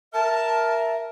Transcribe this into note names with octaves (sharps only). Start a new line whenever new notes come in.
A#4 E5 A5